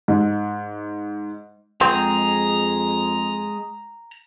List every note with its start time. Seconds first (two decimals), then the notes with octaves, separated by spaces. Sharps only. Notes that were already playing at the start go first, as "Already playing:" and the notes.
0.08 G#2
1.81 F2 G#3 C4 G#4 A#5